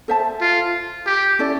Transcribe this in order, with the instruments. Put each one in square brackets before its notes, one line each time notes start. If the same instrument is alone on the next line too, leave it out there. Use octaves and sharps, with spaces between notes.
[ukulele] A4 C5 E5 A5
[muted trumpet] F4
G4
[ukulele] C#4 E4 A4 D5